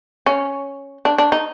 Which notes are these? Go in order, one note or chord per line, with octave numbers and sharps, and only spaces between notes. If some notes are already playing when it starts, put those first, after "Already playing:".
C#4
D4
D4
D#4